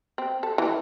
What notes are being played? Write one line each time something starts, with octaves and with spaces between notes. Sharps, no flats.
C4
A4
E3